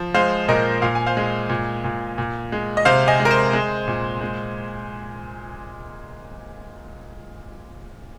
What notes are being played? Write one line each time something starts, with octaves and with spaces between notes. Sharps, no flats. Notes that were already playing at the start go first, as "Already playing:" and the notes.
Already playing: F3
G#3 C5 F5
A#2 A#4 D#5
A#2 F5
G#5
C5 F5
G#3
A#2
A#2
A#2
G#3
D#5
C3 C5 F5
D#5 G#5
G#3
A#4
C5
G#3
A#2
G#3